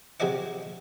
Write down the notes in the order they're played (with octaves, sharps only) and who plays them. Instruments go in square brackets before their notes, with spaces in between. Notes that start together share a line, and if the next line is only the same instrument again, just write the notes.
[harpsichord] C3 F#4 G#4 D5 D#5 F#5